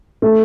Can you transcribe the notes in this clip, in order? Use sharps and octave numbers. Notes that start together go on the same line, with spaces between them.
A3